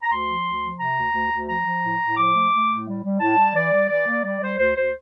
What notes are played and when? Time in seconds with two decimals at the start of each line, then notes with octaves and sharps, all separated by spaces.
0.02 A#5
0.09 D2 C6
0.26 F3
0.44 D2
0.61 F3
0.78 C3 A#5
0.96 D2
1.12 D2
1.30 D2
1.47 F3 A#5
1.65 F3
1.81 A2
1.99 A2
2.16 F3 D6
2.33 A3
2.51 A3
2.68 A2
2.86 G3
3.03 G3
3.20 A2 A5
3.37 G3
3.54 E3 D5
3.72 G3
3.88 E3 D5
4.06 A#3
4.23 G3 D5
4.40 G3 C5
4.57 D2 C5
4.75 D2 C5